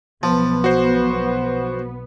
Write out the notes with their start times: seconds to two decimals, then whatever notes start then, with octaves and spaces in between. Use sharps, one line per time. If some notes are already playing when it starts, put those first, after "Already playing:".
0.23 B1 F3 B3 A5
0.64 F#4 C5